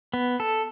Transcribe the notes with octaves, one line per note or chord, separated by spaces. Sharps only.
B3
A4